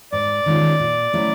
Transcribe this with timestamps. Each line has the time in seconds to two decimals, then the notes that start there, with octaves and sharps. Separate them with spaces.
0.12 G#2 D5
0.46 D#3 G#3 C#4 F4
0.80 A#2
1.13 F#3 A3 C#4 E4